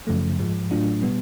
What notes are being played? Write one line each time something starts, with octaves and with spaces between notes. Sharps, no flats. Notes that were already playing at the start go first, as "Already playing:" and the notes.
F#2 C#3 F3 A3
G#2 F3 G#3
A2 F#3 A3 D4 F4
B2 G3 B3